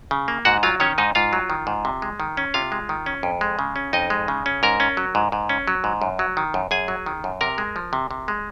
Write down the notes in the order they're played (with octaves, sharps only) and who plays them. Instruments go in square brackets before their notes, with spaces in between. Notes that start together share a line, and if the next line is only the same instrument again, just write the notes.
[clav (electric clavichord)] C#3
A#3
G#2 F#4 F#5
F#3 F4 F5
D#3 C#4 C#5
G#2 D#4 D#5
G#2 F4 F5
F#3
D#3
G#2
C3
G#3
D#3
C#4
C3 F4 F5
G#3
D#3
C#4
F2
G#3
C#3
C#4
F2 D#4 D#5
G#3
C#3
C#4
G#2 A#4 A#5
C#4
F#3
G#2
G#2
C#4
F#3
G#2
F#2
F#3
D#3
F#2
F#2 G#4 G#5
F#3
D#3
F#2
C3 A#4 A#5
G#3
F3
C3
C3
G#3